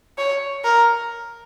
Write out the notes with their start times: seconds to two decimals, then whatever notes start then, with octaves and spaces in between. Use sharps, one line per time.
0.18 C#5
0.64 A#4